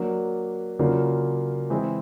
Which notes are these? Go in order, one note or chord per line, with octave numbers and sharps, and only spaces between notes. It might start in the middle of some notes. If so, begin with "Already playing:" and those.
Already playing: F#3 A#3 D4
C#3 F#3 A#3 D4 F4
E3 G#3 C4 E4 G#4